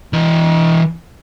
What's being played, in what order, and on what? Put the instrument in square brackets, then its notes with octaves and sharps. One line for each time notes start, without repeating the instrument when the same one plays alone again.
[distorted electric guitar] E3 D#5